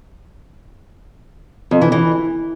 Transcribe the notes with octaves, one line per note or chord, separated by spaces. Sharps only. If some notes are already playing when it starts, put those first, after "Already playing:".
F2
E3
E3